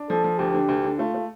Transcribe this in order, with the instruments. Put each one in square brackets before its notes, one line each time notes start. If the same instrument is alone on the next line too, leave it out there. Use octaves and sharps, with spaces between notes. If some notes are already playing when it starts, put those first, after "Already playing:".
Already playing: [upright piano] D4
[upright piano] F3 [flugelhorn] A4
[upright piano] F3
[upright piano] D2 [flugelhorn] G4
[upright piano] D3
D2
D3
[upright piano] A3 [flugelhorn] F4
[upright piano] A3